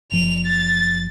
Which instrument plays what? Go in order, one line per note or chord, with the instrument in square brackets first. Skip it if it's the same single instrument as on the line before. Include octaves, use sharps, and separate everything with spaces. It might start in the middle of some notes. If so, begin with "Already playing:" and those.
[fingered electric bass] F#1 F3 [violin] F7
[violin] A6